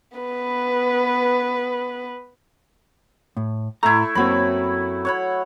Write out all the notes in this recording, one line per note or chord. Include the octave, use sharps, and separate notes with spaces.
B3 B4
A2
A2 A3 E4 A#5
F#2 F#3 A#3 C4 B5
C#5 F#5 B5